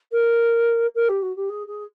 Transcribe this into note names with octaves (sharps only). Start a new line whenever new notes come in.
A#4
A#4
G4
F#4
G4
G#4
G#4